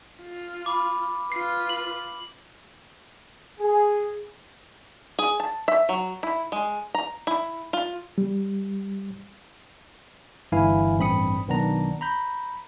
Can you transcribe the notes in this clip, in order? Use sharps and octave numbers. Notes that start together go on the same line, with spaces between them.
F4
B5 D6
F4 B4 C7
F#7
G#4
G#4
A5
E5
F#3
E4
G#3
A#5
E4
F4
G3
G1 G2 E3 E4 F5 G#5
A1 G2 C4 B5 D#6 C#7
B1 D#3 B3 D4 A#5
A#5 B5 G6